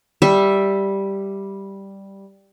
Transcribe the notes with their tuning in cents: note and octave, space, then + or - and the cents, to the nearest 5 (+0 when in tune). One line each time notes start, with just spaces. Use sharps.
G3 +0 E5 +0